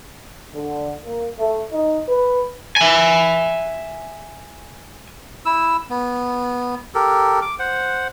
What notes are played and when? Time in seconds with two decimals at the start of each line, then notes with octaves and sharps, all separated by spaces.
0.55 D3
1.05 A#3
1.39 A3
1.73 D#4
2.09 B4
2.76 E5 G#5
5.46 E4 E6
5.90 B3
6.95 G4 A4 A#4
7.42 D6
7.59 C5 F#5